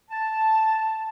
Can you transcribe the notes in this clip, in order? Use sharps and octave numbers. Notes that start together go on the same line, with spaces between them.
A5